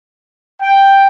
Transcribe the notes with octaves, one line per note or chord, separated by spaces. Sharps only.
G5